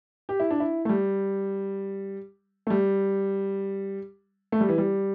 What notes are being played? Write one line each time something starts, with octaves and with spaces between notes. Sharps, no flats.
G4
E4
D4
E4
A3
G3
A3
G3
A3
G3
E3
G3